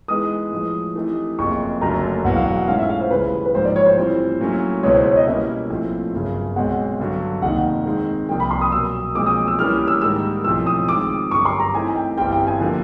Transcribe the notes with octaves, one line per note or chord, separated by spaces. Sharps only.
E3 G#3 B3 D#4 D#6
A2 F3 G#3
E3 A3 C4 D#4 G4
F#1 F2 C#3 C#6
F#1 F#2 D3 F#3 A3 A#5
E1 E2 B2 F#3 B3 F#5
F5
F#5
F#5
G#2 E3 A3 C#4 F4 F5
E5
F5
C5
C#2 C#3 E3 G3 B4
B4
A1 G#2 F3 A#3 C5
D5
C#5
C5
A2 E3 G3 C4 F4
A#2 F#3 A3 C#4 E4
C#2 B2 G#3 B3 E4 C#5
C5
C#5
D#5
B2 G3 A#3 C#4 E4 E5
A#1 A2 F3 A3 C4
G1 F#2 C#3
B1 B2 G#3 C4 F#5
G2 D3 F#3
F1 D#2 D#3 F#5
D#3 G#3 C4
C2 A#2 F3 A#3 G5
B5
C6
D#6
B1 B2 F#3 A#3 E6
B1 A#2 F3 G#3 C4 D6
D#6
E6
A2 E3 G3 A#3 C#4 F6
E6
G#2 D#3 G3 A#3 E6
B1 A2 F3 A3 C4 E6
D#6
D#3 G#3 C4 F4 D6
G1 F#2 D3 G3 C#6
C6
A#5
E3 A3 C4 D#4 G#5
G5
G1 G2 E3 G3 C4 G5
G5
G#5
D3 F3 A#3